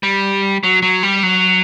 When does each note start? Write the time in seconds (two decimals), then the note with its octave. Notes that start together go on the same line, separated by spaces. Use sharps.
0.03 G3
0.63 F#3
0.82 F#3
1.03 G3
1.23 F#3